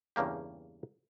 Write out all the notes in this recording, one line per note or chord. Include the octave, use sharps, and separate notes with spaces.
E2 G2 C#3 A#3 G4